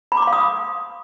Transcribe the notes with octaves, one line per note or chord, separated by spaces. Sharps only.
B5
D6
C6
F5
D#6